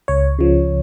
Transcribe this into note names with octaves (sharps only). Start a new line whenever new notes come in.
C#2 C#5
C#3 F3